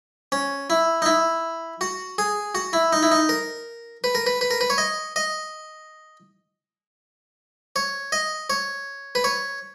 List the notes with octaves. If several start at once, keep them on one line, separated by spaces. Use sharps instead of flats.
C#4
E4
D#4
E4
F#4
G#4
F#4
E4
D#4
E4
D#4
A#4
B4
A#4
B4
B4
A#4
B4
C#5
D#5
D#5
C#5
D#5
C#5
B4
C#5